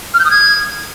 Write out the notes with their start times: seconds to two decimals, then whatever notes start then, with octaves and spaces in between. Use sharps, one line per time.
0.14 F6
0.19 G6
0.25 D#6
0.30 G#6